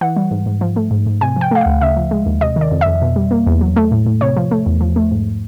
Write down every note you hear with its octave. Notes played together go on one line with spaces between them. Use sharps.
E3 F#5
G3
G#2
G#2
F3
A3
G#2
G#2
C3 G#5
F3 G5
A3 F5
F#5
D2
C#3 E5
F3
G#3
D#2
C3 D#5
D#3
D5
F2
E5
F2
B2
G3
A#3
E2
F#3
A3
A2
A2
C3 C#5
F3
A3
E2
F3
A3
G#2